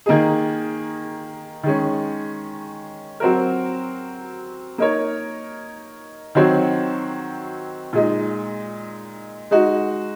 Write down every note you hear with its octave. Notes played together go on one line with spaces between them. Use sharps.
D#3 A#3 D#4 G#4
D#3 G#3 C#4
F#3 C4 F#4 A#4
A#3 D#4 A#4 C#5
D#3 F#3 C4 F#4 C#5
A#2 G#3 D#4
G#3 D#4 F#4